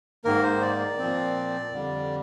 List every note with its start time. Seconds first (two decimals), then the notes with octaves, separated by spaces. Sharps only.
0.25 G#2 D#3 A#3 A#4
0.43 C5
0.62 D5
0.98 A#2 F3 C4
1.71 F2 D3 G3